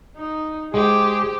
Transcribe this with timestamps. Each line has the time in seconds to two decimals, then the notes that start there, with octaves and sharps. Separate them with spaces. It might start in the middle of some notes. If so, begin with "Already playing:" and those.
0.17 D#4
0.74 G#3 G4 G#4 C5